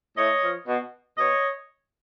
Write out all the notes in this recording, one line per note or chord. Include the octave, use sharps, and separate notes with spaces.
A2 C#5 D#5
F3
B2
B2 C#5 D#5